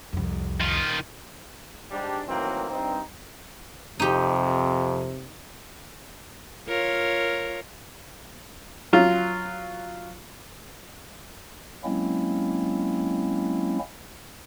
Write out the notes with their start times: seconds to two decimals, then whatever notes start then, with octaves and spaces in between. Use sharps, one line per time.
0.13 C2 F2
0.60 D#3 F4
1.91 G#2 G3 D4
2.27 A2 D#3 E3 F#3 A#3 C4
2.70 G2 C4 D#4
4.00 F2 C3 D#4 G4
6.68 F4 A#4 C#5
8.93 F#3 F4
11.84 F#3 G#3 A#3 C4 C#4 E4